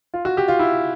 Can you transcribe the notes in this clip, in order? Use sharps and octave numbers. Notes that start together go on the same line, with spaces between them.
F4
F#4
G4
F4
E4